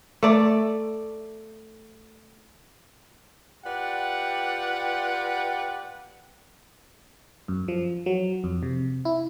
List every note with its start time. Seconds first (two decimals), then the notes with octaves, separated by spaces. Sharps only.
0.23 A3 D5
3.65 F4 G4 B4 D5 F#5 G5
7.48 F#2
7.68 F3
8.06 F#3
8.44 F2
8.63 C3
9.05 E4